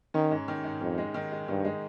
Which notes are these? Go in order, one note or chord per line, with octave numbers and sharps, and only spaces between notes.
D#3 C#4
G#2
D#3
G#2
F2 D#3
G#3
D#3
G#3
G2 D#3
G#3